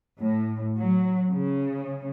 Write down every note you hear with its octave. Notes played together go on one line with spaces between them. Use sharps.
A2
F#3
C#3